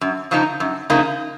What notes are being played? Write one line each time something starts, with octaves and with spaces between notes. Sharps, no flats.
F#2
C#3 F3 A#3 D#4
F#2
C#3 F3 A#3 D#4